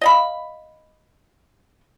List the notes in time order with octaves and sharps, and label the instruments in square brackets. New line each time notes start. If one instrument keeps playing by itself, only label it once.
[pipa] D#5 F5 B5